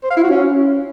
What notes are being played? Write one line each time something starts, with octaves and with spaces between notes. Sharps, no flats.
C5
F5
E4
F#4
C#4